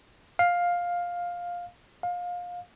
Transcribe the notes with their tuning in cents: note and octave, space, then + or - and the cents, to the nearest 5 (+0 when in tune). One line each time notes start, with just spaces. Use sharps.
F5 +10
F5 +25